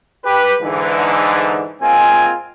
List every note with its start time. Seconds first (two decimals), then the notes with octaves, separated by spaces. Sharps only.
0.25 G4 B4
0.62 G#2 D3 E3
1.82 A#2 G#3 C4 F4 G#5